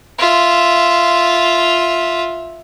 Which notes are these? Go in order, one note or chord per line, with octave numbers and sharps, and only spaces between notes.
F4 E5